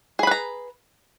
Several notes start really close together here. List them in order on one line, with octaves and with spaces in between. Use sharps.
G#4 B5 B4 A#5